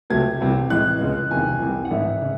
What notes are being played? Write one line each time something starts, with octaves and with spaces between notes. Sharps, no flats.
C#2 C3 F#3 A3 G#6
C2 C3 E3
A1 A2 E3 G#3 F#6
C#2 C#3 G#3
F#1 E2 C3 D#3 G#5
C2 C3 E3
F#5
A1 G#2 D#3 E5
C#3